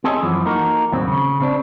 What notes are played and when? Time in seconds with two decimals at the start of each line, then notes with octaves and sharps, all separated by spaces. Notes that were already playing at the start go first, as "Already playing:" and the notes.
0.04 C4 G#4 A4 C#5 D#5 G#5
0.22 F#2 E3 F3
0.45 A#3 D#4 F#4 A4 A#4
0.92 D#2 A2 F#3 C4
1.08 C#3
1.40 C#3 C4 D4